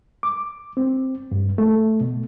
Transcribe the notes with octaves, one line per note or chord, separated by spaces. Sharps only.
D6
C4
G2
A3
B2